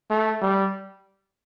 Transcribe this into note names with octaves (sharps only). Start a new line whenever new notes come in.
A3
G3